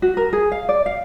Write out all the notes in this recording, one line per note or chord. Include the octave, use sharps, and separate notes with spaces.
F#4
A#4
G#4
F5
D5
F5